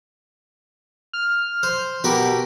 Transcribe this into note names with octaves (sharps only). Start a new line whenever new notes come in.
F6
C5
B2 G4 A#4 B4